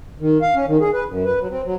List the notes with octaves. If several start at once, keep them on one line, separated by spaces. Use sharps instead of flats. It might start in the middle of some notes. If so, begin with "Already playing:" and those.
D#3
F5
C#4
D#3
G#4
B4
F#2
B4
F#3
C4
F#3